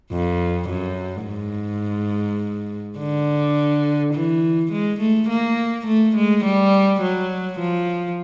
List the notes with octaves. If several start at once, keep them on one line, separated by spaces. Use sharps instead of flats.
F2
F#2
G#2
D3
E3
G#3
A3
A#3
A3
G#3
G3
F#3
F3